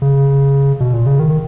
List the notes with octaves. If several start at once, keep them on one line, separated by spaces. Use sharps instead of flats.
C#3
B2
A#2
C#3
D#3